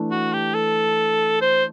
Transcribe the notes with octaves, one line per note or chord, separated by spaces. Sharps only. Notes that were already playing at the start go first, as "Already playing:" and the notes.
Already playing: E3 A3 D4
F#4
G4
A4
C5